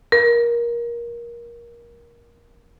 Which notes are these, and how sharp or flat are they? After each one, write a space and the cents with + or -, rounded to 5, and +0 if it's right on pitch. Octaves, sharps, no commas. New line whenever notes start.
A#4 +20